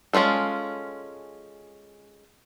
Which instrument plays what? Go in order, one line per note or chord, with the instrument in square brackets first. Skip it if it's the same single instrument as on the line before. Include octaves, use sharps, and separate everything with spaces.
[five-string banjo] G#3 C#4 E4 F4 A4